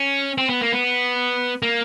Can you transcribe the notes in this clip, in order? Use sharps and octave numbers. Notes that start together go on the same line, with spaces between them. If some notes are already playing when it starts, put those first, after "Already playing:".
Already playing: C#4
C4
B3
A#3
B3
A#3